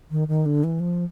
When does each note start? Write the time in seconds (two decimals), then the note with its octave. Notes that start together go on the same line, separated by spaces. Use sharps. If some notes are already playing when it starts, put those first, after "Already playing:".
0.11 D#3
0.28 D#3
0.46 D3
0.64 E3
0.80 F3